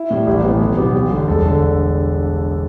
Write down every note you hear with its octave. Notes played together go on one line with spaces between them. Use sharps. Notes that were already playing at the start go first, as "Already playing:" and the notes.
Already playing: E4
A2 G3
A1 G4
E4
A2 E3 A3 B3
B1
B2 B3 G4
A1
G2 D3
E1 A4
D3